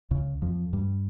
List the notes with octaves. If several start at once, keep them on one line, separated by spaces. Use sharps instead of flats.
C#2 C#3
F2 F3
G2 G3